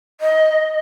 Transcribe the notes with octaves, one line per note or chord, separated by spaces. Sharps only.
D#5